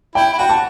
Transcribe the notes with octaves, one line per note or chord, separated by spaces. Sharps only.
E4 G5
E4
F#4 G5
A5